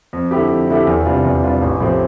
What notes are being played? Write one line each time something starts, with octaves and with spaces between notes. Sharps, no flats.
F2
D3 A3 E4 G4
F2
D3 A3 E4 G4
E2
C3 G3 D4 F4
E2
C3 G3 D4 F4
A1
A2 F3 C4 G4